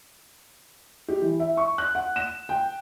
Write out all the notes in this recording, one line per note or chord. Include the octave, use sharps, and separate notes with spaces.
G4
E3
E5
C#6
F#6
F#5
E7
G5